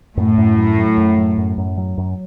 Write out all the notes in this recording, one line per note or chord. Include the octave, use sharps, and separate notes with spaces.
F#2 A2
F#2
F#3
F#3
F#2
F#3
F#2
F#2
F#3
F#2